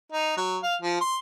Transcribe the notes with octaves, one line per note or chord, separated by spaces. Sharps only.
D#4
F#3
F5
F3
C6